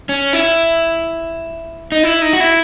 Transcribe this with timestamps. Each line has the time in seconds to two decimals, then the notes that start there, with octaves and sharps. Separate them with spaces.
0.09 C#4
0.33 E4
1.92 D#4
2.03 E4
2.22 D#4
2.33 F#4
2.40 E4